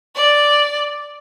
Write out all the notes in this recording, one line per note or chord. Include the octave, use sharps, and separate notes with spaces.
D5